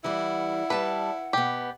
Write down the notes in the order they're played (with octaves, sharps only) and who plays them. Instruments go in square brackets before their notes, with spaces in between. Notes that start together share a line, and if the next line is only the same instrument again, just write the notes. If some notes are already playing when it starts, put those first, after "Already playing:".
[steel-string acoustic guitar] E3 G3 [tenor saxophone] E4 [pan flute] F#5
[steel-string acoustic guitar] G3 A5 [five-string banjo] B4
[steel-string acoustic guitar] B2 B3 [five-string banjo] G4